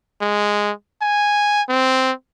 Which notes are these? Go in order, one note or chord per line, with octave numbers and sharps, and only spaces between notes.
G#3
G#5
C4